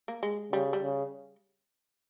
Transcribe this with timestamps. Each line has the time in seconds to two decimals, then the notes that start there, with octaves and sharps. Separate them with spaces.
0.08 A#3
0.23 G#3
0.52 C#3 G3
0.73 G3
0.83 C#3